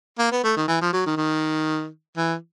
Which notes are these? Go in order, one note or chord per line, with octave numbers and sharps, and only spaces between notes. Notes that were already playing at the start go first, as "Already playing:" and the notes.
A#3
B3
A3
D#3
E3
F3
F#3
D#3
D#3
E3